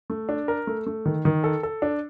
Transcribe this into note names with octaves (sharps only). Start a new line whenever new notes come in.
A3
D4
A#4
A3
A3
D#3
D#3
A4
A4
D4